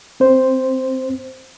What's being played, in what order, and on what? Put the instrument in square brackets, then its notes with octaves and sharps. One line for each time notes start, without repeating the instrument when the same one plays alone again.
[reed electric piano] C4 C5